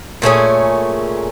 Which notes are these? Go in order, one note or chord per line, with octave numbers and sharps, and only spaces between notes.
A#2 A3 C#4 G#4